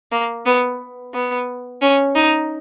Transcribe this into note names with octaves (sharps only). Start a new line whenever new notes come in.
A#3
B3
B3
C#4
D#4